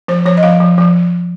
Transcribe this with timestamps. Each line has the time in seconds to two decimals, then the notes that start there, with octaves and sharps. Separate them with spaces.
0.08 F3 C5
0.26 F3 C#5
0.37 D#5
0.43 F3 F5
0.60 F3
0.78 F3